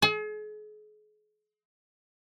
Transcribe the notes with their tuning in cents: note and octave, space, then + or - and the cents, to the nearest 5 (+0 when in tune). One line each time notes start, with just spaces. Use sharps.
G#4 +40